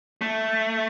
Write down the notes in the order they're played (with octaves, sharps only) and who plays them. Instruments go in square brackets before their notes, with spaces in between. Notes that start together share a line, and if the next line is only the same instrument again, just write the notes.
[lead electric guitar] A3